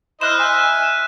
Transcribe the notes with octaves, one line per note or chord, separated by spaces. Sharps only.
E4 C5 D#5 F6 F#6 E7
E5 G#5